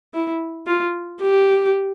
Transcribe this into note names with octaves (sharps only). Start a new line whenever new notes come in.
E4
F4
G4